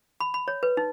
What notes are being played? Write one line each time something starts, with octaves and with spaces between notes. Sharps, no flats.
B5
B5
C#5
B4
D#4